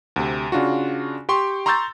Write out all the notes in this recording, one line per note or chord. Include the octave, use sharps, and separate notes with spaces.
D2 C3
C#3 D4 F4 F#4
G4 G5 C6 C#6
A#5 C6 C#6 E6 G6 A6